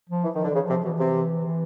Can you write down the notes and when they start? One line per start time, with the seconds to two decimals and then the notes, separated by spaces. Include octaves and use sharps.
0.09 F3
0.24 E3
0.35 D#3
0.37 F3
0.44 D3
0.51 C#3 E3
0.63 F3
0.69 C3
0.85 B2 E3
1.00 C3
1.46 E3